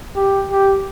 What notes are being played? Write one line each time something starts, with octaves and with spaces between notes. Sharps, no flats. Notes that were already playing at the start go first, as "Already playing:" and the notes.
G4
G4